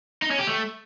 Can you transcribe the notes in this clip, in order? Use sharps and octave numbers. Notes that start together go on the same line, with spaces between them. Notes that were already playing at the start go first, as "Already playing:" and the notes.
D#4
C#4
G4
A3